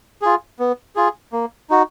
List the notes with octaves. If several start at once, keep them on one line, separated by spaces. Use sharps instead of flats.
F4 G#4
B3
F4 G#4
A#3
D#4 F#4